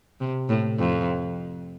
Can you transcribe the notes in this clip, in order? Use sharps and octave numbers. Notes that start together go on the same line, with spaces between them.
C3
A2
F2